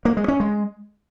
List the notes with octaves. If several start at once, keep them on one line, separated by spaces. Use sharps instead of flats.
A#3
G#3
C#4
G#3